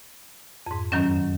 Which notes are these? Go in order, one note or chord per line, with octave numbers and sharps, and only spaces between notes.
F2 G#2
F#2 D#3 F#3 C#4